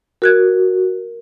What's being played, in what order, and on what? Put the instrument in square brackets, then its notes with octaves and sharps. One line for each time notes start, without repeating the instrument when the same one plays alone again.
[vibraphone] F#4 [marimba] A#4 F#6 G#6